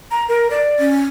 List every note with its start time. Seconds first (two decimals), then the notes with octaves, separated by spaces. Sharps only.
0.11 A#5
0.29 A#4
0.51 D5
0.79 C#4